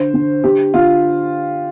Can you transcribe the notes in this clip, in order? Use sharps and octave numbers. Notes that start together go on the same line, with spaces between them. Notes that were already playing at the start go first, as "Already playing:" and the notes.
Already playing: D3 C5
D3
D3 G4
D3 F4